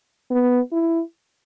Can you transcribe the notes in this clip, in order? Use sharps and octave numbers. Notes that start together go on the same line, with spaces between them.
B3
E4